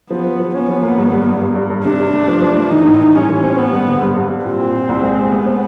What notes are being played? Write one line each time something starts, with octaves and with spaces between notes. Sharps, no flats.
F3 B3
F3
F3
B3 C#4
F3
A#3
G2
G2
G2
G2
G2
G2
C3 D4
C3
A3
F3
F3
A3
E3 D#4
A2
E3
G3 C#4
E3
C4
B3 C4
G2
D3
G2
G2
G3
A#2 C4
A#2
A#2
C2
G#3
G#3
A3 B3
C4